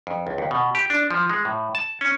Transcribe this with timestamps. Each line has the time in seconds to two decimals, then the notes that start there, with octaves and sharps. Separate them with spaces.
0.07 F2
0.27 C#2
0.38 D#2
0.51 B2
0.75 G4
0.90 D4
1.11 F3
1.29 G#3
1.45 A2
1.75 A5
2.01 C#4